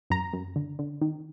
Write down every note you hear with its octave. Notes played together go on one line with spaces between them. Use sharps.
F#2 A#5
F#2
D3
D3
D#3